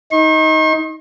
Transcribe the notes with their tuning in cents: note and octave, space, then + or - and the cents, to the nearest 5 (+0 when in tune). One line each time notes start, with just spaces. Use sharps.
D#4 +20 C#6 -45